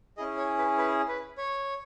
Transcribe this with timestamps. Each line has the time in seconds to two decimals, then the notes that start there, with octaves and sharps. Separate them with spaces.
0.17 C#4 E4 G#4 D#5
0.37 C#5
0.58 B4
0.78 B4
1.08 B4
1.38 C#5